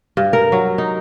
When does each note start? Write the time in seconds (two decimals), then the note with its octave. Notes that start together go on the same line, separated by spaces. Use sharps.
0.17 G2
0.33 A#4
0.52 F#3
0.78 D#4